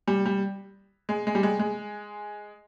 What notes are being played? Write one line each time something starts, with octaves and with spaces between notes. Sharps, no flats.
G3
G3
G#3
G#3
G3
G#3
G#3